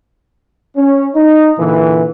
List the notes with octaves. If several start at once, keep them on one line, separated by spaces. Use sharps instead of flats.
C#4
D#4
A#2 D3 E3